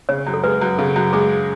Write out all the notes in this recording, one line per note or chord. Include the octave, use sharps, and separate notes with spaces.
C#3 C#5
F#2
A4
G#3 B4
F#2
C#3 A4
F#2
G#3 G#4